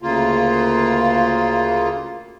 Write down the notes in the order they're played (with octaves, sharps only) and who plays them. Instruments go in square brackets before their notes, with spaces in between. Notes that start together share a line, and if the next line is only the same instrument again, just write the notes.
[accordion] D2 C#3 A#3 F4